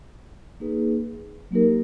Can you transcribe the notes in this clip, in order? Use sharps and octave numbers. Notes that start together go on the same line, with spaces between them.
A#3 D#4 G#4 B4
F#3 A#3 D#4 G4 A#4